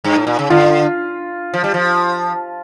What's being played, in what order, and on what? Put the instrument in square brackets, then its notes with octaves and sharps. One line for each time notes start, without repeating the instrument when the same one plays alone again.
[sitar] G2
A2
A#2
C#3
[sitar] D3 [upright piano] F4
[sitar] F3
G3
F3